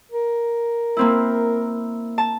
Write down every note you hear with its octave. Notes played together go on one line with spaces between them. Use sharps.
A#4
A#3 C4 E4
A5